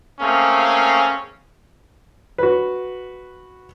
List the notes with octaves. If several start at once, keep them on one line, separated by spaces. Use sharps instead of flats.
A3 A#3 C4 C#4 G#4 F5
F#4 B4